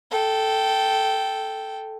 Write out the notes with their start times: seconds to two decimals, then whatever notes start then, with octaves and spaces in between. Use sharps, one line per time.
0.11 A4 G5